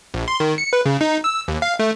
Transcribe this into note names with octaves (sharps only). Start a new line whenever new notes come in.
A#1
C6
D#3
C#7
B4
C#3
D#4
E6
D#2
F5
A3